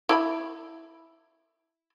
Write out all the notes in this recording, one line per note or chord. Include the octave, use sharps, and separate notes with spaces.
E4 F5 B5